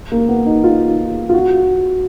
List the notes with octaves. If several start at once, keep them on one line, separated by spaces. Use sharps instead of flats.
A#3
B3
D#4
F4
F4
F#4